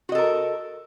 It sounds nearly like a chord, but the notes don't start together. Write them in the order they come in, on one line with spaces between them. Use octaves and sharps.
F#4 D#5 A4 A#4